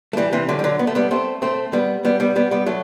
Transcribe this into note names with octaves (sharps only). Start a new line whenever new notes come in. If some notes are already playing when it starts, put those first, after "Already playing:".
A3
E3 G3
C3 E3
D3 F#3
G3
D3 F#3
B3
A3
G3 B3
A3 C4
A3 C4
G3 B3
G3 B3
G3 B3
G3 B3
G3 B3
F#3 A3